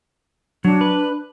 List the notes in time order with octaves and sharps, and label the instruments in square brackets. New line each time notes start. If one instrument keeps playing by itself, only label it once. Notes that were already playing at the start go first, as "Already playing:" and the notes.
[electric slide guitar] F#3 [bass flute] D4
[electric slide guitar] B4